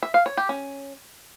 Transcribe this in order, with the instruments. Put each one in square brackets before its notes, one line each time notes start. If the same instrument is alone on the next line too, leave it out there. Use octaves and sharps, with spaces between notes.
[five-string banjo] E5
F5
C#5
G4
C#4